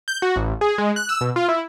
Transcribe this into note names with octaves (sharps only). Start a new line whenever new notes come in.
G6
F#4
A1
G#4
G#3
F#6
E6
B2
F4
E4